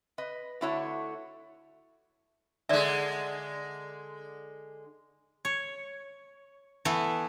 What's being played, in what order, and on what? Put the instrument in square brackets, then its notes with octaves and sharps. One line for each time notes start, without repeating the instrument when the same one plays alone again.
[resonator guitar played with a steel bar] B4 D#5
D3 A3 E4 F#4 C#5 A5
[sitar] D3 G#3 [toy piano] D5 E5
[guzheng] C#5
E3 A3 B3 E4